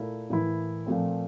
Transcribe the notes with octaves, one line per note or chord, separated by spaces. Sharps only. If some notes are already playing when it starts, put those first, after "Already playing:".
Already playing: A#2 A3 E4 A#4
A2 E3 A#3 E4
A#2 F3 A3 C4